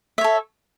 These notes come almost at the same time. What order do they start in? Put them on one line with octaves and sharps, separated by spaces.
E5 C#5 A4